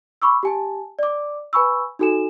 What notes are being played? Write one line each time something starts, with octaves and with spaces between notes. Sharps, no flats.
B5 C#6 D6 E6
G4 G#5 A5
D5 D6
B4 G#5 B5 C#6 E6
D#4 F#4 A4 G#5 E7